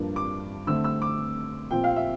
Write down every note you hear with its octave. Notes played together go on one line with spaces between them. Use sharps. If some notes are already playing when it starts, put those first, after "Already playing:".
Already playing: G2 F3 A#3 D4
D6
D3 A3 C4 E6
E6
D6
A#2 F3 C4 G5
F5
E5